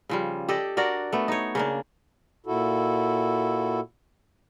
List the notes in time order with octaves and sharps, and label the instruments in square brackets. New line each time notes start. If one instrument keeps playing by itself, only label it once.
[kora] C#3 F3 G3
G4 A4 D5 D#5
D4 F#4 A#4 D5
A3 B3
D#4 C#5
C#3 A#3 D4
[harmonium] A#2 E4 F#4 A4